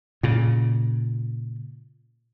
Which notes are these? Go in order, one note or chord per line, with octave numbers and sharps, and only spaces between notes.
A#2 C#3